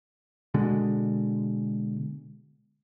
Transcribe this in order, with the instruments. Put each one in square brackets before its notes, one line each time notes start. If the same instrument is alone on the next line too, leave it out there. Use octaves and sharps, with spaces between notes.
[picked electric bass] B2 D3 G#3